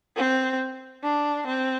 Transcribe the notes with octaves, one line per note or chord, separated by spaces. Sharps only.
C4
D4
C4